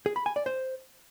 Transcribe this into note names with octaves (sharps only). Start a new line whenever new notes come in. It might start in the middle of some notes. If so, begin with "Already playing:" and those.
G#4
B5
G#5
D5
C5